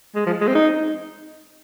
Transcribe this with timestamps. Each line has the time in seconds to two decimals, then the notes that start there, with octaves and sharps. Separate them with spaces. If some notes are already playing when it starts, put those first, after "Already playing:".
0.15 G#3
0.26 F3
0.41 G#3
0.48 C4
0.55 D#4